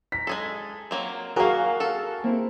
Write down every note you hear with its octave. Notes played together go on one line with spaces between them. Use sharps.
A#5 B6
G#3 G#4 A4
F#3 A#3 C4
F#3 A#3 F#4 G#4 A#4 F5
A4
A#3 C4 E4